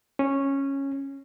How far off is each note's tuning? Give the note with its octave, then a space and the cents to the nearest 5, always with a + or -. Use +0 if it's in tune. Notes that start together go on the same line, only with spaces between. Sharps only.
C#4 -10